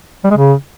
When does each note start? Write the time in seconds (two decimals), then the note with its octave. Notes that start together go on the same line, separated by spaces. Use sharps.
0.24 G3
0.31 G#3
0.37 C#3